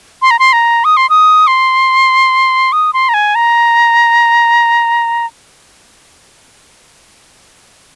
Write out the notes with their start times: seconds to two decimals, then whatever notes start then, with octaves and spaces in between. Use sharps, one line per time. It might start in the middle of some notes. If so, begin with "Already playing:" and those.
0.22 C6
0.31 A#5
0.39 C6
0.53 A#5
0.85 D#6
0.97 C6
1.10 D#6
1.47 C6
2.72 D#6
2.93 C6
3.09 A#5
3.14 G#5
3.35 A#5